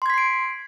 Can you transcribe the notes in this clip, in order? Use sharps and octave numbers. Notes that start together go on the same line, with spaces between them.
C6 G#6 B6 C7 D7